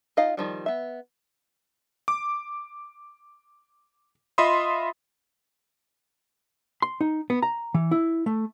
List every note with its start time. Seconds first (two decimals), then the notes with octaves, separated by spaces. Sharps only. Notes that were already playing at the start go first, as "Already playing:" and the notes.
0.17 D#4 F4 D#5 F5
0.37 D#3 F3 G3
0.66 B3 E5
2.08 D6
4.38 F4 D#5 E5 B5 C6 D#6
6.82 C6
7.01 D#4
7.30 B3
7.42 A#5
7.74 E3
7.91 E4
8.26 A3